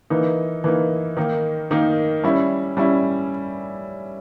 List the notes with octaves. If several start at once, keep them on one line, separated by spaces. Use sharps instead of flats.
E3 A#3 D#4
E3 A#3 D#4
D#3 A#3 D#4
D#3 A#3 D#4
G3 C#4 E4
G3 C#4 E4